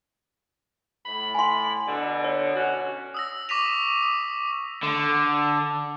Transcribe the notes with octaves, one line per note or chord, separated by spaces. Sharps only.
A2 B5
G#5 C6
B2 D3
C#5
C#4 F#4
D#6 E6 A#6
C#6 D6 A#6 B6 D#7 F7
D#6
D3